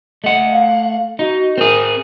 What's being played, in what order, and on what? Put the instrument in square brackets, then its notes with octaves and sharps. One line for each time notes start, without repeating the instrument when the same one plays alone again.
[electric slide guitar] A3 F#5 [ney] D#5
[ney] F5
[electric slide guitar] D#4 [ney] F#4
[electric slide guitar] C4 G#4 [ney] A#4